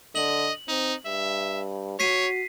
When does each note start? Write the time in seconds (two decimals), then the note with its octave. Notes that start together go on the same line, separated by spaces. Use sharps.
0.16 D3 D#5 F#7
0.68 C4 D#4
1.06 G2 E5
2.00 F#4 C#5 B6 C7 D#7